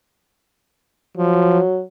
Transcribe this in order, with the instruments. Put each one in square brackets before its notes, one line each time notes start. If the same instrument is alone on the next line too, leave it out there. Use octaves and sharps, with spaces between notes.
[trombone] F3 [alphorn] F#3